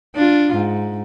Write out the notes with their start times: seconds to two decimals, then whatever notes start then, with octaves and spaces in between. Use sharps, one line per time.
0.15 D4 F4
0.55 G#2